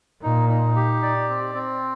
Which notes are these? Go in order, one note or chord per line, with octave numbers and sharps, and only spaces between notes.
A#2 D#4
D#4
G4
D5
C4
C4